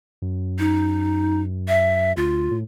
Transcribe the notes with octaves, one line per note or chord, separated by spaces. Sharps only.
F#2
D#4
E5
D2 F4
A2